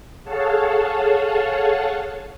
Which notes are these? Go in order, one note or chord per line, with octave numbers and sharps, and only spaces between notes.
G#4 A4 C#5 F5 F#5 A5